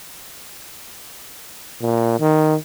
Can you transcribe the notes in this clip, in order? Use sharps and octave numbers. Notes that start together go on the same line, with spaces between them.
A#2
D#3